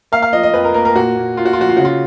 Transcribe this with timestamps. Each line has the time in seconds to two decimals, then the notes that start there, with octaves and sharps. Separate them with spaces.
0.12 A#3 F5
0.22 F5
0.33 F3 D#5
0.43 D#5
0.54 F2 B4
0.64 A#4
0.74 A#3 A#4
0.85 A#4
0.96 A#2 F#4
1.16 A#2
1.37 A#2 F4
1.45 F#4
1.53 F4
1.58 F3 F#4
1.69 F4
1.77 C#3 F#4
1.85 F4